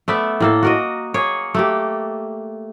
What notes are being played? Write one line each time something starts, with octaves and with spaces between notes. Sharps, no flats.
A3 B3 D5 E5
A2 A#3 A4
F#4 A#4 D#5
A#3 G#4 C#5
A3 A#3 G4